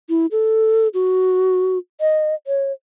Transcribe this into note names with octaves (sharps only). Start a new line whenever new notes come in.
E4
A4
F#4
D#5
C#5